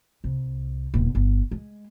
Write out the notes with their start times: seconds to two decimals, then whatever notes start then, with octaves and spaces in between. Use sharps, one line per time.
0.24 C2
0.94 D#1 B2
1.15 G1
1.51 G#3